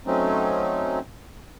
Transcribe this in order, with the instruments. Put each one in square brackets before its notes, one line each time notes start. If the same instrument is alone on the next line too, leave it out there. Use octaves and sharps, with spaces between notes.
[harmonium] F#3 A3 C4 C#4 D#4